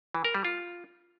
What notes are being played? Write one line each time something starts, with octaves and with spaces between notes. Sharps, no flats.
E3
A#4
G3
F4